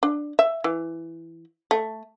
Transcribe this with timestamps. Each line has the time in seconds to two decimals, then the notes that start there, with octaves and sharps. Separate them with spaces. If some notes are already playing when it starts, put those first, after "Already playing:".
0.03 D4
0.39 E5
0.64 E3
1.71 A3